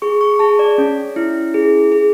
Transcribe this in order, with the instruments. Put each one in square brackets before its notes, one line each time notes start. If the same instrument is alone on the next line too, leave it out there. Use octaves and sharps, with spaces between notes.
[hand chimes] G#4 C#6
C#6
G#4 A5
D5
C#4
E4
G#4
G#4